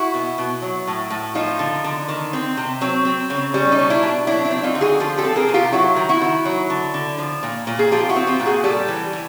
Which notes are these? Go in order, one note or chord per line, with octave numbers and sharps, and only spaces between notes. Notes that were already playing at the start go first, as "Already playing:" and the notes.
Already playing: E4 F#4
B2
B2
F#3
A2
A2
F3 D#4 F4
D3
D3
D#3
C4
C3
F#3 C4
C4
C#3
G3 C#4
C#4 D#4
B2
D4 E4
B2
F#3 D4 E4
D4 E4
C4
D#4 F4
D3
F#4 G#4
F3 F4 G4
G4 A4
C4
G#4 A#4
C3
F4 G4
F#3 E4 F#4
D#3
E4 F#4
D#3
F#3
D3
D3
F3
A#2
A#2
G#4
F3 F4 G4
E4 F#4
C4
F4 G4
A#2
F#4 G#4
G3 G4 A4
E3
E3